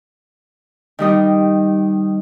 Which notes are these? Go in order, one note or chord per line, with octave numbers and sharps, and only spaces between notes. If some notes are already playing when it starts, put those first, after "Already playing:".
D#3 G3 D#4